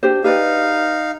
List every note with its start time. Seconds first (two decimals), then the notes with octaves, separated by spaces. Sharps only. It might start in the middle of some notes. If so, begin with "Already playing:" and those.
0.03 D4 G4 C5
0.24 D#4 G4 B4 D5 F5